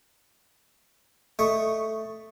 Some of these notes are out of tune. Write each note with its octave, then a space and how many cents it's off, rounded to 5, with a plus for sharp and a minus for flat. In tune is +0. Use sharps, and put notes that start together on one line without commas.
A3 +0 D#5 +0 C#6 +0